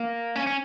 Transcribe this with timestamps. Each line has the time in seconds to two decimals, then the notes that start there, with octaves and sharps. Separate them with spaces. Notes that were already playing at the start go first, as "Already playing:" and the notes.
Already playing: A#3
0.35 C#4
0.47 C#4